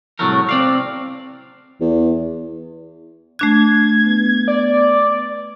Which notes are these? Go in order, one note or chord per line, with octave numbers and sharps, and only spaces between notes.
C2 A2 F#3 A3 A#4
C4 D5 F5
E2
A3 D4 F#6 G#6
B3
D5